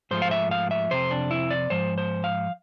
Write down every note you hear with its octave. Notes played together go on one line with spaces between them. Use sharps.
G#2 F3 A3 C5
F5
E5
F5
E5
F2 C3 C4 C5
D4
E4
D5
G#2 F3 C5
C5
F5